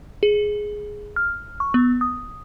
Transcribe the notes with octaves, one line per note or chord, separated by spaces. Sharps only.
G#4
F6
C#6
B3
D#6